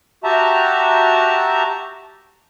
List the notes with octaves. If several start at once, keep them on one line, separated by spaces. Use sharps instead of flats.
F#4 G4 E5 A5 A#5